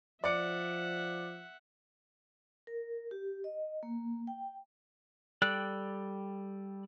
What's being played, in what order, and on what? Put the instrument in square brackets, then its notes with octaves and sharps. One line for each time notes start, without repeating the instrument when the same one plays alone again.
[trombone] F3 [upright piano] D5 D6 C#7 [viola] E5 F#5
[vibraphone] A#4
G4
D#5
A#3
G5
[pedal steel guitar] G3 A4 D5 G5 F#6